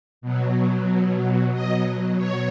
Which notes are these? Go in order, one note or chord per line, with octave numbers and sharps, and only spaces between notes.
B2 F#3
B2 F#3 D#5
C#5